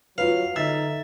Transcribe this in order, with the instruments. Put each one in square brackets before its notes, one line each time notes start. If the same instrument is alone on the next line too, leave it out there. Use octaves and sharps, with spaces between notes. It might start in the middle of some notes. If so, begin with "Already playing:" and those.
[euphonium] F#3 [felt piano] F4 B4 [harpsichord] F5
[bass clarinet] D3 [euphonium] D#4 [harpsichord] E5 [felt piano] A6